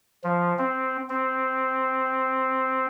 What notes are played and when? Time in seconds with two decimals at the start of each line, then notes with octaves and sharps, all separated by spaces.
0.24 F3
0.58 C4
1.09 C4